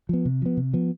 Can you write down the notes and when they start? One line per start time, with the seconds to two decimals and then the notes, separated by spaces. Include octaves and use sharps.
0.09 F3 B3
0.25 C3
0.42 F3 B3
0.57 C3
0.73 F3 B3